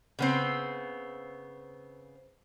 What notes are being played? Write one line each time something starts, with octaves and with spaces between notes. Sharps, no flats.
C#3 B3 C4